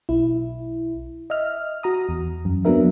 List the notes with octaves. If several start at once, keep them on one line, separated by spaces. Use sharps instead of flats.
B1 E4
D#5 E5 F6
F#4 A#5 D#6
E2
F#2
F#3 A#3 B3 D4 A#4 E5